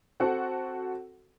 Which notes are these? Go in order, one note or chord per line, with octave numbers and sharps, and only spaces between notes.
C4 F#4 A4 F#5